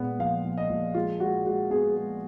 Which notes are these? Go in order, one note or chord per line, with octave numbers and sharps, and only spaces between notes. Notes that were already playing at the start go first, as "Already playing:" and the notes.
Already playing: A#2 G#3 B3
A#1 F5
A#1
D#5
A#1
G#3 F4
G#3 F#4
G#3 F#4
B3 G#4
G#3